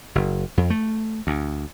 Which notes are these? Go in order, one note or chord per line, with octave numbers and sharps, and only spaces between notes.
F#1
F2
A3
D2